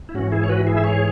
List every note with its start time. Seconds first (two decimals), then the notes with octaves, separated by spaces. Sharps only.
0.09 E4
0.14 G#2 E3 C#4 F#4
0.32 E4 G#4
0.44 C#5
0.49 F#4 B4
0.67 E4 G#4
0.77 E5
0.84 G#4 C#5